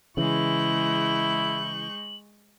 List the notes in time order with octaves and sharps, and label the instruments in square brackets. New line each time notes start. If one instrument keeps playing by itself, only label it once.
[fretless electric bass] C#3 E3 [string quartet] G#3 C#6 G6 [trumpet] E4 [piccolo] F#7